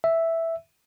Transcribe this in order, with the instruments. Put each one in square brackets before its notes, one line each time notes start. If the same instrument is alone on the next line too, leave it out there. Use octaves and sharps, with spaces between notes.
[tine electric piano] E5